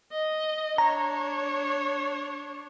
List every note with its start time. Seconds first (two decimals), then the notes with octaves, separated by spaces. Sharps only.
0.12 D#5
0.78 D4 C#5 A#5